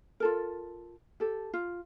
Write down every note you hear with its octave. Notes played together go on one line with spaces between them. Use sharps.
F4 A4 A#4
G4 A4
F4